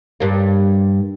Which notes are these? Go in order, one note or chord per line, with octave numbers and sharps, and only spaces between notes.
G2 A#3